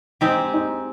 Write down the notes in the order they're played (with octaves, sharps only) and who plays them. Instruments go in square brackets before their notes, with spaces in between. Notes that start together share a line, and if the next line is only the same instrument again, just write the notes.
[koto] G#3 C4 G4 [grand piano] D#4
[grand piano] D#4